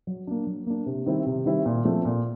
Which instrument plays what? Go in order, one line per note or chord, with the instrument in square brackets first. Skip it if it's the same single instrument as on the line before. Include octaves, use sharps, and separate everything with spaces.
[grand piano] F#3
A#3 D4
F#3
A#3 D4
C3
D#3 G3 C4 E4
C3
D#3 G3 C4 E4
A#2
F3 A3 C4
A#2